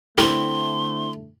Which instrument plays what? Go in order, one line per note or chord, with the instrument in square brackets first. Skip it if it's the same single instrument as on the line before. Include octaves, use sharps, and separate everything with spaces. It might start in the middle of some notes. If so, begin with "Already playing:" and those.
[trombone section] D3 A3 [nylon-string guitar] C4 E4 [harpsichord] G4 A#4 [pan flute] C6